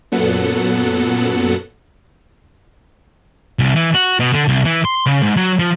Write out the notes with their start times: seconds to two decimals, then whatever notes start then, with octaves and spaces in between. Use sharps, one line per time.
0.12 F#2 A#2 F#3 B3 A4 F#5
3.59 C2
3.76 E3
3.94 F#4
4.20 B2
4.33 D3
4.48 C2
4.65 E3
4.85 C6
5.06 C#3
5.23 G#2
5.37 F#3
5.59 F3